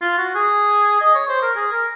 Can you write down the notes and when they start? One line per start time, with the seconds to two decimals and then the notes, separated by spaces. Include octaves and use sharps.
0.01 F4
0.18 F#4
0.35 G#4
1.01 D#5
1.15 C#5
1.29 C5
1.42 A#4
1.56 G#4
1.72 A#4